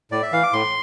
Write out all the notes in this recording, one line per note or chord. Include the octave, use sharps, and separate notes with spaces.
A2 D5
E5
E3 F5
D6
A2 C6